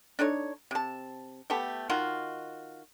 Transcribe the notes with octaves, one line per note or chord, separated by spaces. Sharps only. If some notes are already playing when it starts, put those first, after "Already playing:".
D4 D#4 A4 C#5
C3 A5
A3 B3 G4 A5
D#3 D#4 F4 F#4